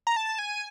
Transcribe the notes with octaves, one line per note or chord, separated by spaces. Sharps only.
A#5
A5
G#5